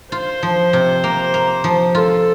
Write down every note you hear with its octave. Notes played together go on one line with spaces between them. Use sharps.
F4 C5
F3
C3
A#3
A#3
F3
F4 A4